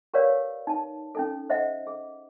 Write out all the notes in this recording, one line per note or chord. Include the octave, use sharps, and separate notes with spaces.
G4 A#4 B4 C#5 D5 F5
D#4 A5
C#4 D#4 A4
C5 D#5 E5 F#5
G#4